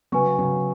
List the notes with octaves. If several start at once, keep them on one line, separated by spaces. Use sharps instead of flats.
C#3 F#3 B4 G#5 C#6
C#3 F#3